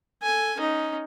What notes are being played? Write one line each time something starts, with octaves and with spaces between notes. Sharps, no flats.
A4 G#5
C#4 D#4